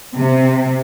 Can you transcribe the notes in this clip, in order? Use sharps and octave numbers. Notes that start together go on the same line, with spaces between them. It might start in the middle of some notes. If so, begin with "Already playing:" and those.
C3